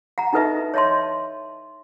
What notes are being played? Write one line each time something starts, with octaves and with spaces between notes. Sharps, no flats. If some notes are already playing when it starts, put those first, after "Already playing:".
F#5 A#5
D#4 E4 A4 B4 D#5 E5
C#5 D#5 E5 A5 C6